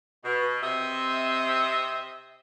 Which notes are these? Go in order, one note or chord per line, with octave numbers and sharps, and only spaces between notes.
B2
C3 C4 D#5 E5